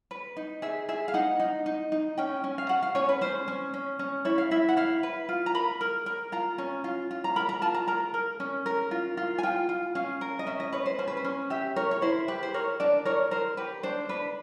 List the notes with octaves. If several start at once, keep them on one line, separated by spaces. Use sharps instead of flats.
B4
D#4
G#4 E5
G#4 E5
F5
D#4 F#5
D#4
D#4
D#4
C#4 G5
C#4
F5
F#4 F#5
F5
C#4 C#5
B4
C#4 C5
C#4
C#4
C#4
E4 C#5
F5
E4 E5
F#5
E4 F5
B4
F4
A#5
A#4 B5
A#4
A#4
F4 A#5
C#4
F4
F4
A#5
A#4 B5
A#5
F4 A5
A#5
A#4 A#5
A#4
C#4
A#4
F4
F4
G#5
F4 G5
F4
C#4 F5
A#4
D#5
C#4 E5
D#5
B4 C#5
C5
C#4 C5
B4
C5
C#4
G4 E5
A#4 C#5
C#5
E4 C5
G4 B4
C5
A#4 C#5
D4 D5
A#4 C#5
A#4 C5
G4 B4
D4 C5
D4 B4